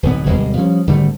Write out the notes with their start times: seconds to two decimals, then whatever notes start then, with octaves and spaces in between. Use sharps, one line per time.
0.03 D1 B1 B3
0.26 D1 B2 G3 G#3
0.57 F3 G3 C#4
0.87 G#1 D3 G3 A3